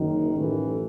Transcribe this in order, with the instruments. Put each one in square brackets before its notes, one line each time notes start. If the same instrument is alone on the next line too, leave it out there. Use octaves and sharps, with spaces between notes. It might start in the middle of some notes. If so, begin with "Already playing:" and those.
Already playing: [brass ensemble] F#1 F#2 D#3
A1 A2 E3